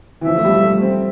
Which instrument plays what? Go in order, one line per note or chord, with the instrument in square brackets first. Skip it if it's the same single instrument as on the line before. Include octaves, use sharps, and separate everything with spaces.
[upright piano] E3
[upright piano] F3 [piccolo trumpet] E5
[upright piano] A3
G3
A3
C4